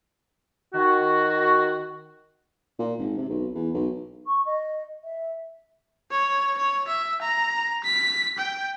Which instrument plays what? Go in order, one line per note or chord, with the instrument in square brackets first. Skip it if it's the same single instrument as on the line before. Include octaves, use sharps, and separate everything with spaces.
[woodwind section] D#3 F#4
[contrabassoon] A#2
G#1
C3
B1
E2
B1
[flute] C#6
D#5
E5
[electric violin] C#5
C#5
E5
A#5
B6
G5